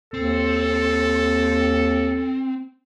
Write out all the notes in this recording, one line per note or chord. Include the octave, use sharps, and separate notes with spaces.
D#2 C4 A4